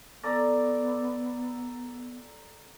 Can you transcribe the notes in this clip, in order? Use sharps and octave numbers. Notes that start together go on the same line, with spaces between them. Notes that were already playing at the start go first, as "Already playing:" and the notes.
B3 A4 D5 A#5